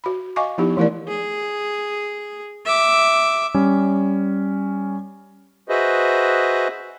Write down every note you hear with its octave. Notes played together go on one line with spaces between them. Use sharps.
F#4 B5
D#5 F5 G#5 C#6 D6
F3 B3 D#4 E4 G4
E3 A3 E4 A#4 D5
G#4
E5 D6
G3 C#4
F#4 G#4 B4 C5 D#5 E5